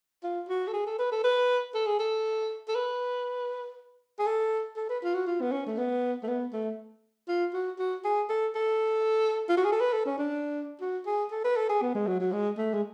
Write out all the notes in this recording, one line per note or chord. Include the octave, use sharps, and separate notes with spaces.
F4
F#4
A4
G#4
A4
B4
A4
B4
A4
G#4
A4
A4
B4
G#4
A4
A4
B4
F4
F#4
F4
B3
C#4
A3
B3
A3
B3
A3
F4
F#4
F#4
G#4
A4
A4
F4
F#4
G#4
A4
B4
A4
C#4
D4
F#4
G#4
A4
B4
A4
G#4
B3
G#3
F#3
F#3
G#3
A3
G#3